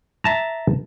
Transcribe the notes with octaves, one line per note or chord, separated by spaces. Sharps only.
E5 A5 A#5